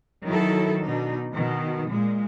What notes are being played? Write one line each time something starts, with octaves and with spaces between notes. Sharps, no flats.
D#3 F#3 E4 A4
B2 D4 D#4
B2 D#3
A#2 G#3